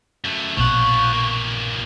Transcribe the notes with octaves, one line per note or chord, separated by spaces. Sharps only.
F#2 A3
A#1 B2 F3 F#5 C#6
E3 A#3